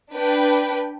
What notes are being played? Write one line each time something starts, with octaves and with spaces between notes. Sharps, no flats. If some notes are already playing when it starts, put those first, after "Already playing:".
D4 B4 G5